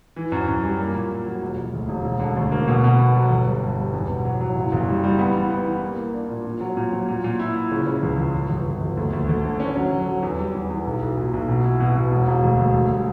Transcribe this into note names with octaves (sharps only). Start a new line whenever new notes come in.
E3
F#2
F#2
G3
A#3
A#2
A#2
F#3
E1
E1
D2
E1
E1
D3
D2
A#3
B2
B2
B3
F#3
G1
G3
G2
G3
E2
B2
F#3
F#3
F#1
F#1
G3
G3
B3
E3
B3
E3
A#3
A#3
D4
A#2
A#2
F#3
A#2
F#3
A#2
A#2
E4
E4
C#3
C#3
C#2
C#2
G1
G1
G1
G1
D2
D2
D2
D3
C#4
F#3
F#3
F#3
E2
G3
E2
E2
B1
B1
A#2
B1
B2
E4
B2
B2
E1
E1
D2
D2
D2
G3